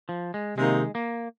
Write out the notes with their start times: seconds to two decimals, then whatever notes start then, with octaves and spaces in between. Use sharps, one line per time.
0.09 F3
0.34 G#3
0.57 C3 D#3 G#3 A#3 D#4
0.95 A#3